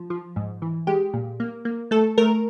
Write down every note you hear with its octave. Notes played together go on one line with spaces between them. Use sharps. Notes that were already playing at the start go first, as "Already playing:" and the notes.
Already playing: F3
F3
G#2
E3
G#3 G4
A#2
A#3
A#3
A3 A4
A3 A#4